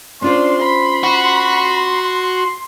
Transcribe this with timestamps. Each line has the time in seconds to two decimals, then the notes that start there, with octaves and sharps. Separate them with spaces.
0.22 C#4 D4 F4 C5 C6
0.62 B5
1.03 F#4